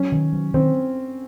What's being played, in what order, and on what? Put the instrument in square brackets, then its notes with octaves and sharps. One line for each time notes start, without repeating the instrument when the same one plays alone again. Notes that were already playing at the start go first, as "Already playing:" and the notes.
Already playing: [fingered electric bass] F#3 [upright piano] C#4
[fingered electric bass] D#3
F#3
[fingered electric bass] D#3 [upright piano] C4